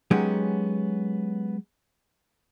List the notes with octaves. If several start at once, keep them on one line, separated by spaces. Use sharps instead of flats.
F#3 G#3 B3 C#4 D#4 G4